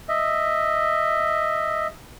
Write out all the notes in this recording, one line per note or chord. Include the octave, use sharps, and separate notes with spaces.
D#5 E5